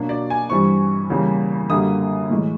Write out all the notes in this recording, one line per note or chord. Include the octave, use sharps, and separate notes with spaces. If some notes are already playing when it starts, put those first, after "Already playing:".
Already playing: B2 F#3 A#3 D4
D5
G#5
G2 E3 G3 C4 C#6
E2 C#3 E3 G3 A#3
F#2 D3 G3 A#3 D#6
A2 E3 G#3